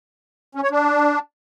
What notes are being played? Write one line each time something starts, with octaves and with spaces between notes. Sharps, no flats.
C#4
C#5
D4